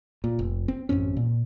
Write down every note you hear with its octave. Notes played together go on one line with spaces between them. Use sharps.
A#2
F1
C4
A1 F#2 C4 C#4
A#2